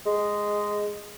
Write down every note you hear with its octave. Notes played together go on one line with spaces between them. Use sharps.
G#3